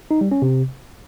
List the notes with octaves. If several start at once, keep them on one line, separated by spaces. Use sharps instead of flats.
D#4
G3
C#4
C3